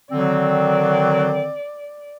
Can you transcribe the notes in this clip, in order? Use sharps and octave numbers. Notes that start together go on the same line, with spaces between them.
D3 D#3 F#3 C4 D5